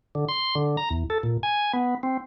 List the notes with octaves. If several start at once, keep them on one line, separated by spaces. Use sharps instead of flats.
D3
C6
D3
A#5
E2
A4
A#2
G#5
B3
C4